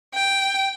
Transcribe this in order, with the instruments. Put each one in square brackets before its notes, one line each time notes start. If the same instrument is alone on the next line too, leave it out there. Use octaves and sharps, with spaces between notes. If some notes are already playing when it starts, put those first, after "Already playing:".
[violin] G5